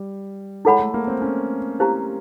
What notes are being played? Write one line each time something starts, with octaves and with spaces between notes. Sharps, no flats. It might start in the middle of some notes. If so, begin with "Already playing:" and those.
Already playing: G3
G#3 E4 A4 C#5 F#5 B5
A3
A#3
C4
C#4
E4 G4 C5 F5 A#5